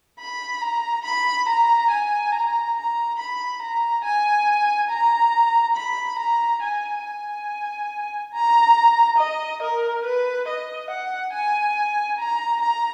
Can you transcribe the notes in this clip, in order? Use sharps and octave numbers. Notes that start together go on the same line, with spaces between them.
B5
A#5
B5
A#5
G#5
A#5
A#5
B5
A#5
G#5
A#5
B5
A#5
G#5
G#5
A#5
D#5
A#4
B4
D#5
F#5
G#5
A#5
A#5